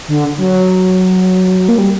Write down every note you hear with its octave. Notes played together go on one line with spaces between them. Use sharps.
D3
F#3
A#3
G3